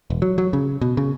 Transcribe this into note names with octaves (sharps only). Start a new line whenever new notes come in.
E1
F#3
F#3
C#3
B2
C#3